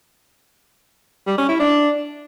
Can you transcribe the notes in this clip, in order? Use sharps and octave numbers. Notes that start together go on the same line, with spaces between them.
G3
C#4
E4
D4